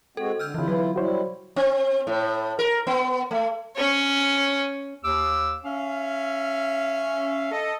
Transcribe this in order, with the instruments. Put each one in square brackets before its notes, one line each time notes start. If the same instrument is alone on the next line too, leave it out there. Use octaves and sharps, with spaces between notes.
[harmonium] G#3 C4 F#4 [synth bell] A4
[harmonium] D3 [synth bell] E6 F6 G6
[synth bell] D3 E3 [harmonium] E4 F4
[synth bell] F#3 [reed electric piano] B4
[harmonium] G3 E4 [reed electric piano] F#4 C5 C#5
[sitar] C4
A2
A#4
B3
A3
[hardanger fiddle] C#4 C#5
[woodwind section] D#2 D6 E6
C#4 E5 F5
A4 D#5